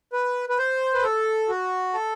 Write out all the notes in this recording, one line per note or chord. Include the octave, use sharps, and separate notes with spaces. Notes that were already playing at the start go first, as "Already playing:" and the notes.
B4
B4
C5
B4
A4
F#4
A4